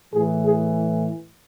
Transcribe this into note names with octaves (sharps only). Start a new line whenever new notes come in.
A2 E3 G#4
G#4